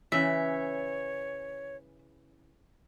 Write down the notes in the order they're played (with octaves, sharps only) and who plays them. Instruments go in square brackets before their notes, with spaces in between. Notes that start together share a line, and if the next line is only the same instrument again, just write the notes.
[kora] C#3 E3 [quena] C#5 [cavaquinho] E5